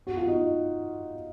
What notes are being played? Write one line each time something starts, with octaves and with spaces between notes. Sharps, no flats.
F#4
F4
D#4 F#4